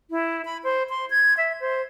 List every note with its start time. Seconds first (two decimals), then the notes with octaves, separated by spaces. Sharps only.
0.11 E4
0.45 B5
0.64 C5
0.90 C6
1.10 G#6
1.37 E5
1.60 C5